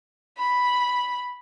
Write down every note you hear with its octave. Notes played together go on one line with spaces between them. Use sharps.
B5